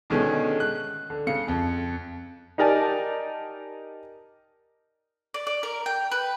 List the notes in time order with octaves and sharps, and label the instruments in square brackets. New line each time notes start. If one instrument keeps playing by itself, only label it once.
[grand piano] B2 D3 D#3 G#3 A3 C#4
F#6
D3
C#3 C#7
F2
[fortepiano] D#4 G4 A#4 D5 G#5 A5
[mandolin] D5
D5
A#4
G5
B4